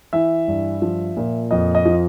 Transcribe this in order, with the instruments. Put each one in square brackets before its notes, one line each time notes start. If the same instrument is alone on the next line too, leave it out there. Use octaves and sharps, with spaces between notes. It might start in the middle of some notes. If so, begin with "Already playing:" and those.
[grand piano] E3 E5
G2
F3
A#2
F2 D#5
D#5
F3